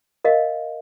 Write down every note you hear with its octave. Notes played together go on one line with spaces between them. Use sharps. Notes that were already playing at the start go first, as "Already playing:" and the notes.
A#4 D#5 F5